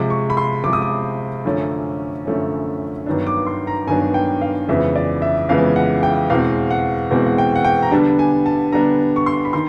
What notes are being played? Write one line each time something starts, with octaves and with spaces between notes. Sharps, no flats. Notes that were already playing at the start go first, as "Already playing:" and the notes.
Already playing: C3 F3 G#3 D6
C#6
B5
C6
C3 F3 G#3 D6
D#6
D6
F#2 D3 F3 A3 C#4
F#2 D3 F3 A3 C#4
G2 D#3 F#3 B3 D4
D6
C6
A#5
G2 D#3 F#3 B3 D4 G#5
G5
F5
F2 C#3 E3 G#3 B3 E5
D5
E5
F2 C#3 E3 G#3 B3 F5
F#5
G5
E2 B2 G#3 C4 F5
F#5
E2 B2 G#3 C4
F#5
G5
F#5
G5
A#5
D3 G3 B3 D4 A5
G#5
A5
D3 G3 B3 D4 A#5
C#6
C6
B5
D#3 C6